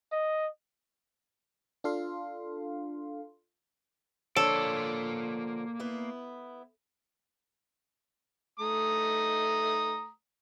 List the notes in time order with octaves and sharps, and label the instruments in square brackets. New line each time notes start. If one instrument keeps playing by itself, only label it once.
[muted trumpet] D#5
[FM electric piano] D4 F4 A4 F5 C6
[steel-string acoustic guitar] D3 F3 C#5 [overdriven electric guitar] A#3 D5 [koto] A4
[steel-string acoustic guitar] B3 E4
[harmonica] A3 A#5 D#6